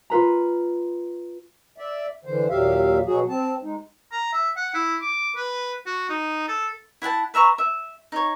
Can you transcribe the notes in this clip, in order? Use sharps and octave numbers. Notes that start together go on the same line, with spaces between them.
F4 B4 A#5
D5 E5
D3 E3 C5
D#2 A#2 F#3 G4 E5 F5
B2 F#3 F#4 G#4
C4 A5
G#3 D#4
A#5
E5
F#5
E4
D6
B4
F#4
D#4
A4
E4 F#5 G5 A5
B4 E5 A#5 C#6
E5
D#4 C#5